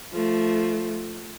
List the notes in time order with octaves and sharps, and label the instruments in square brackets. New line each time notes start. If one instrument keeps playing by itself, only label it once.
[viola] F3 A3